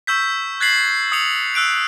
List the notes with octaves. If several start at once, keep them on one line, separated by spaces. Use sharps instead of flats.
C#6 E6 G6 B6
F#6 G#6 A6 B6 C7 F#7
D#6 E6 C#7 F7
E6 F#6 D7 F7